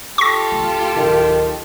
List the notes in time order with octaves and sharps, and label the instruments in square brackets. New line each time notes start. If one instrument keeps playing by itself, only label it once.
[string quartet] F4 G4 A4 [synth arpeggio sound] C#6 A#6
[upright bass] C#2 A3
[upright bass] D1 [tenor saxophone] D#3